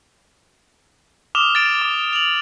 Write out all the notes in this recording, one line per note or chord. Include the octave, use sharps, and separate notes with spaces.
D6 D#6 F6 E7 F7 G7
A6 D7
D6
F7 F#7